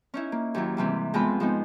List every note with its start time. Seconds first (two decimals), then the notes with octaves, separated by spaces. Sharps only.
0.14 C#4 D#4 E4
0.32 A#3
0.55 D#2 F#3 E4
0.77 G#2 C3 E3 G3
1.14 F2 G#3 B3 C4 F4 B5
1.40 F3 G#3 B3 D#4